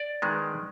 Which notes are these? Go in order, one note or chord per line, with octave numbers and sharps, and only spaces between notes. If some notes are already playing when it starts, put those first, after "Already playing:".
Already playing: D5
D#3 G#3 B3